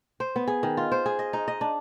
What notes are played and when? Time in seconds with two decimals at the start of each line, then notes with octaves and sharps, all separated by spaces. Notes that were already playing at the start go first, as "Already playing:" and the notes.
0.20 C5
0.36 B3
0.47 G#4
0.63 D#3
0.77 F4
0.92 C5
1.06 G#4
1.19 D#5
1.33 D#4
1.48 D#5
1.61 D4